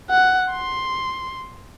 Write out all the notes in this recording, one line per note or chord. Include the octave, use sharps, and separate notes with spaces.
F#5
C6